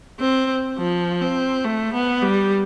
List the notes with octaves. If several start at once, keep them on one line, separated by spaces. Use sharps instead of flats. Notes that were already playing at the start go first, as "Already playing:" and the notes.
C4
F3
C4
A3
B3
G3